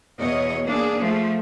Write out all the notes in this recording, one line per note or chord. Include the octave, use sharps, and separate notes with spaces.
E2 B2 C#5 D#5
A#3 D4 G#4
F3 A3